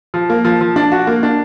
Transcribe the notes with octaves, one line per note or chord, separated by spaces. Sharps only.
F3
A#3
F3
F3
D4
F#4
A#3
D4